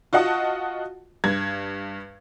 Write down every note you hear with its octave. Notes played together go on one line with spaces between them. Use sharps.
F4 F#4 D#5 F#5 A5 D#6
G2 G#6